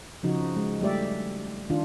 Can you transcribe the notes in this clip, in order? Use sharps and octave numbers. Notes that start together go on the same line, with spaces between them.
C#3 F3 D#4 F#4
G#3
G3 A3 G4 D5 E5
D#3 D4 F4